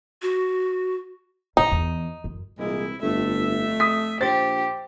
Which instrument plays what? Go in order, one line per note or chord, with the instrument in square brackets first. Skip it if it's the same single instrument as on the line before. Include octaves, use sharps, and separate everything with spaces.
[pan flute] F#4
[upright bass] C2 C3 [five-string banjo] D#4
[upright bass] E2
F#2
[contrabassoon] C2 [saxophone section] A#2 E3 G#3 [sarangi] E4
[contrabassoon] G1 [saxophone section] F2 A3 [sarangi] E5
[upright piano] D#6 B6
[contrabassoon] A#1 [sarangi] G4 [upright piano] C5 A6